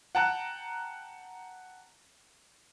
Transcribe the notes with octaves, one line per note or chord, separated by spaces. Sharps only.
F#5 G5 A5 A#5 F#6